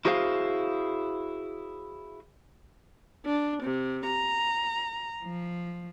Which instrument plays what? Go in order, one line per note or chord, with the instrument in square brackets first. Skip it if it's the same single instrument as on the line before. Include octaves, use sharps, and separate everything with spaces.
[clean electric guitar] E4 F#4 G#4 C5 E5 F5
[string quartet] D4
C3
A#5
F3